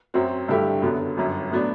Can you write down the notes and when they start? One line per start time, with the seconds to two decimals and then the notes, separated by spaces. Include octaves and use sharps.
0.14 F#2 F#3 C4 F#4
0.49 G2 D3 A3 E4 G4
0.82 F#2 D3 F#3 B3
1.17 G1 F#2 F#3
1.51 A2 F#3 B3 D4